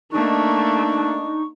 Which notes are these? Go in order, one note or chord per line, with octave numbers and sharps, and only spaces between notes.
A3 A#3 D4 D#4 C#6